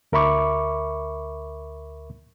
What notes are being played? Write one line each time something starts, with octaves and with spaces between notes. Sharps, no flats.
D2 A#4 E5 B5 C#6 D6